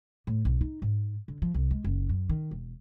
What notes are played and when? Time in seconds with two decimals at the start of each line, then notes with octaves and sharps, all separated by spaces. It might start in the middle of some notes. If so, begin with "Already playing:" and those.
0.27 A2
0.45 B1
0.61 D#4
0.82 G#2
1.28 D3
1.42 F3
1.54 C2
1.71 G#3
1.84 F#1
2.09 F#2
2.29 D#3
2.51 E1